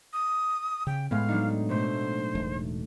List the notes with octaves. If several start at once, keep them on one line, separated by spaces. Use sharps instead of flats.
D#6
C#3 G5
A2 G#3 B3 F5
F#3 D4 D#4
B2 A3 C5
E1